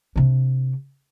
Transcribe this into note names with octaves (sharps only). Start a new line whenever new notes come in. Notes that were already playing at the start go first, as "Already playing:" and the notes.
C3 D4